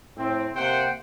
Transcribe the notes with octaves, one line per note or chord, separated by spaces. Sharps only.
A2 C4
C3 A#3 C5 F#5 G5